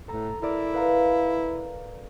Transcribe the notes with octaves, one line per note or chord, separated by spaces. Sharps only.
A2 A4 A#5
E4 A4 A#4 D5
B4 F5 A#5